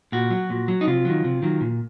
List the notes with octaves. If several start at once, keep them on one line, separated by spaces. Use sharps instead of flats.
A#2 F#4
F#3
A#2
F#3
D#4
C3 F4
D#3 F#3
C3
D#3 F#3
A#2